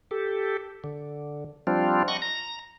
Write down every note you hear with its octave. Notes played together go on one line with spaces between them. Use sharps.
G4 A4
D3
F3 G3 C4 D4 F4
D#5 F#5 C#6
A#5 A#6